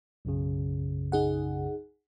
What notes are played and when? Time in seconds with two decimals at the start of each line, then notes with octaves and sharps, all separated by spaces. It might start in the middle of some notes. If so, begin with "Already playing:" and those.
0.25 B1 F#2 C#3
1.12 D#4 G#4 F#5